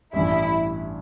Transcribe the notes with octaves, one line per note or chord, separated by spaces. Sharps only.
A1 G2 E3 E4